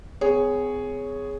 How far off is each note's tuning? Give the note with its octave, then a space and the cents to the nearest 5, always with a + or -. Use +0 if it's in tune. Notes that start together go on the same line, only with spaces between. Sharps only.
B3 +45 G#4 +0 C#5 +0